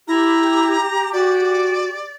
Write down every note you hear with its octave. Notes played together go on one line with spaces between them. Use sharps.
E4 G4 A#5
F#4 D5